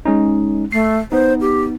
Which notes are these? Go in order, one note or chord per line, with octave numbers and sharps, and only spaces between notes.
G#3 C#4 D#4
A3 C7
B3 D#4 C5
G4